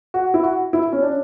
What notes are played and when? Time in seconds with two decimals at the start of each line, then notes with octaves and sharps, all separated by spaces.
0.14 F#4
0.34 E4
0.43 F#4
0.73 E4
0.93 C#4
1.02 D4